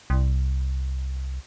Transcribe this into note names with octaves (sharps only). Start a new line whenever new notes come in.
C2